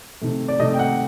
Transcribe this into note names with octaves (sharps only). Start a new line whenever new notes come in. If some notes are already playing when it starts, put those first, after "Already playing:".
C3 D#3 A3
D5
C3 D#3 A3 D#5
G5
F#5